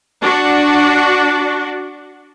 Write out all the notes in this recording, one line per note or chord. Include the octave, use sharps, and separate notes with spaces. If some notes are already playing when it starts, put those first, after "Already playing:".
D4 F#4